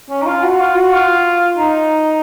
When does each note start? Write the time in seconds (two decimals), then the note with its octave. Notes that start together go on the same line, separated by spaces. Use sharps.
0.10 C#4
0.22 D#4
0.26 F4
0.43 F#4
0.60 F4
0.75 F#4
0.92 F4
1.57 D#4